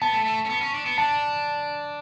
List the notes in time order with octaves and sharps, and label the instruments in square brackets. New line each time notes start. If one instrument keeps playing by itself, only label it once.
[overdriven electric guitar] B3 [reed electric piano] A5
[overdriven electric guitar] A3
A3
C#4
B3
C#4
D4
B3
[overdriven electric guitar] D4 [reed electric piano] A5